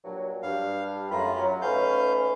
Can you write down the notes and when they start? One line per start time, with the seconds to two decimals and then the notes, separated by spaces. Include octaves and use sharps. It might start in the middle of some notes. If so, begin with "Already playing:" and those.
0.04 G2 A#2 F#3
0.43 G2 F5
1.10 F#2 A3 F4 A#5 B5
1.38 F#3
1.62 G#2 A3 C#4 B4 F5 G6